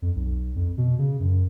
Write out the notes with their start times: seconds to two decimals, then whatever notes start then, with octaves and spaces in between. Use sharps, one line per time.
0.02 F2
0.16 B1
0.55 F2
0.78 B2
0.99 C#3
1.20 F#2